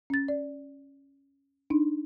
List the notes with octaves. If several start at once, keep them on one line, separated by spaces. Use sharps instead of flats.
C#4 A6
D5
D4 D#4